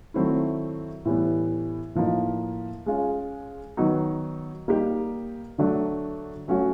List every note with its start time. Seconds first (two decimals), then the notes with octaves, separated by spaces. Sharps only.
0.14 D#3 F#3 A3 C4 E4
1.05 A2 E3 G3 B3
1.95 A2 F3 A#3 D#4
2.86 G#3 C#4 F4
3.77 D#3 F#3 B3 D#4
4.68 G3 A#3 D#4 G4
5.58 D3 F#3 A3 D4
6.48 F#3 A3 C#4 F#4